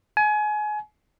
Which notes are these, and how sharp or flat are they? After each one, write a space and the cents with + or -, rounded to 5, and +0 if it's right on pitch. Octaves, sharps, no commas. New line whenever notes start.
G#5 +30